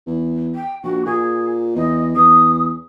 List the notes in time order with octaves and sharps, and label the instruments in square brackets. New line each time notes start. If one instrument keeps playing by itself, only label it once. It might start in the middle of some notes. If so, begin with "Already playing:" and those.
[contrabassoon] E2
[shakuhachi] G5
[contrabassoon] A#1 [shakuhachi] F#4
[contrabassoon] A#2 [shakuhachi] G#4
[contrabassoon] E2 [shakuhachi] D#5
[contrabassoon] E2 [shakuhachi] D#6